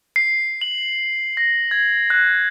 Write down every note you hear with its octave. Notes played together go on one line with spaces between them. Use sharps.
C7
F#7
A#6
G#6
F#6